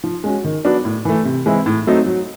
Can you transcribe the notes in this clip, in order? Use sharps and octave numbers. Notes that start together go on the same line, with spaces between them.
F3
G#3 C#4 F#4
D#3
F#3 B3 D4 F#4
A2
E3 A3
C3
E3 G#3 C4 E4
A2
F#3 A3 C4 D#4
F#3